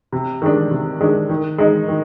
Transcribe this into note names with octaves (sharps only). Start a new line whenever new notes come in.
C3
D#3 G#3 D4
C3
D#3 G#3 D4
D#3
G#3 D#4
D#3